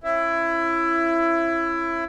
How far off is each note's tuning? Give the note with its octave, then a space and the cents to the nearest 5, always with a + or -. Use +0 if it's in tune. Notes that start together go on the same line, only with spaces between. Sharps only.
C#4 -35 E4 +20